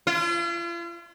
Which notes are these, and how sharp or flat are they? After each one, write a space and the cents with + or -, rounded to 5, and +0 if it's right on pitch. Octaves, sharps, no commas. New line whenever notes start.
F4 -40